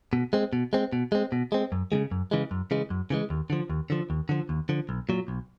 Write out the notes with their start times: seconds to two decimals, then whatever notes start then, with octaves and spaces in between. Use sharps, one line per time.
0.13 B2
0.33 G#3 C4
0.53 B2
0.73 G#3 C4
0.93 B2
1.12 G#3 C4
1.32 B2
1.52 G#3 C4
1.72 F#2
1.92 C#3 E3 G#3
2.11 F#2
2.31 C#3 E3 G#3
2.51 F#2
2.71 C#3 E3 G#3
2.90 F#2
3.10 C#3 E3 G#3
3.30 D#2
3.50 D3 F3
3.70 D#2
3.90 D3 F3
4.10 D#2
4.29 D3 F3
4.49 D#2
4.69 D3 F3
4.89 B1
5.09 A#2 F#3
5.28 B1